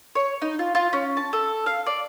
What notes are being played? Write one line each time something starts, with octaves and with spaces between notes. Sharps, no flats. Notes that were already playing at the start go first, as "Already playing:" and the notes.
C#5
D#4
F4
F4
C#4
A5
A4
F5
D5